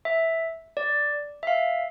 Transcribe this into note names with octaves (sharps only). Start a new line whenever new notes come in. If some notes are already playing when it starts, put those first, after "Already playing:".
E5
D5
E5
F5